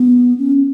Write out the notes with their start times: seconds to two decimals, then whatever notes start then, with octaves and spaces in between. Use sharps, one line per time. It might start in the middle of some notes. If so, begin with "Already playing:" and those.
Already playing: B3
0.39 C#4